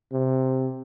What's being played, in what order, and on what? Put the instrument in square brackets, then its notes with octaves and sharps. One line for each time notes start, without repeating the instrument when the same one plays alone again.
[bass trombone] C3